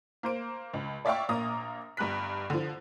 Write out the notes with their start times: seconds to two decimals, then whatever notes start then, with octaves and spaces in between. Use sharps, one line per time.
0.23 A#3 C5 D7
0.74 C#2
1.05 C#5 D5 E5 F5 G5 C#6
1.29 A#1 A#3 A#5 D#6
1.97 G1 G2 A#5 F#6 B6
2.50 D3 F3